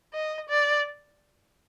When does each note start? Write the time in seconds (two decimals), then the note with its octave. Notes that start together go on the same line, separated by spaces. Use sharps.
0.13 D#5
0.49 D5